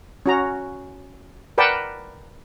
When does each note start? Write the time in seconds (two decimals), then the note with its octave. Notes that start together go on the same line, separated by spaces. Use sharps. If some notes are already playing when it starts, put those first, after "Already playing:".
0.26 C#4 F#4 A#5
1.58 A#4 B4 D5 F#5 G5 A5